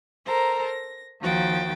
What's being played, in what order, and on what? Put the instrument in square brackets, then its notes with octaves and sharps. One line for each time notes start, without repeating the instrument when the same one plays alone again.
[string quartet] A4 A#4 C5 A#5
A#6
D#2 D#3 F3 F#4 G5 A6